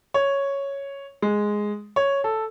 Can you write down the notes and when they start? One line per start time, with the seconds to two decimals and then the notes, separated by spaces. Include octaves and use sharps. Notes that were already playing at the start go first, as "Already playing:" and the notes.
0.14 C#5
1.22 G#3
1.96 C#5
2.24 A4